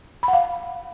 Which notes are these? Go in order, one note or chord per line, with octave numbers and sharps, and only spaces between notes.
B5
F#5
F5